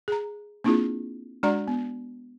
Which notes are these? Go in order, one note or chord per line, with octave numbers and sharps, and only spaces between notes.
G#4 A#5
A#3 C4 D4 E4 F4 G#4
G#3 D4 F#4 D5 A#5
B3